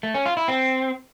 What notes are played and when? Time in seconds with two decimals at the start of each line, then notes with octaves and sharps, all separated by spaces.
0.03 A3
0.14 C#4
0.26 F4
0.37 E4
0.48 C4